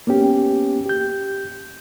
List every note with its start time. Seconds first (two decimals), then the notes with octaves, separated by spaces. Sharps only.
0.07 A#3 B3 C#4 G4
0.86 G4 G6